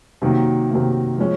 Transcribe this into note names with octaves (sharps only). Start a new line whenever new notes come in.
C3 D#3 F#3 A#3
C3 D#3 F#3 A#3
F3 G#3 C#4